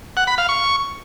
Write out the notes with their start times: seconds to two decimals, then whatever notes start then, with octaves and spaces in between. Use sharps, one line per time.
0.17 F#5
0.27 B5
0.38 F5
0.49 C#6